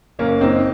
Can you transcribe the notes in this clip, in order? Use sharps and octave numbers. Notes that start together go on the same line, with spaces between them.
F#1 A#3 C#4
F#1 C4 D#4